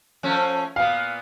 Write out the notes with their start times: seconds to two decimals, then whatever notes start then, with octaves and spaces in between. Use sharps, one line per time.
0.23 F3 A3 C#4
0.76 A#2 B3 F5